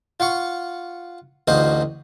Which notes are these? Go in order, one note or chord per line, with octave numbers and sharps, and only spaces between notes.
F4 F5 F#5 C#6
A1 D2 D#4 F#4 C5 F5